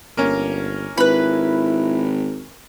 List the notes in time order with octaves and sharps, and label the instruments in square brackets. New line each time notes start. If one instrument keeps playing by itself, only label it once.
[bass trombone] G1 [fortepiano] A#3 C#4
[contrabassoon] G#1 [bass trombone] E4 [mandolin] B4 B5